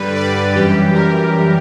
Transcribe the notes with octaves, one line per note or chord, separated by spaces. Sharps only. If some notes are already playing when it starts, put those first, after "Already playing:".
Already playing: G2 D3 G3 B4
D5
F#2 E3 G3 G4
A#4